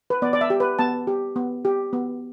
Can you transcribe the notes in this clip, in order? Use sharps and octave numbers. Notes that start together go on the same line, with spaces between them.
B4
B3 D5
D5
E5
G4
B4
B3 A5
G4
B3
G4
B3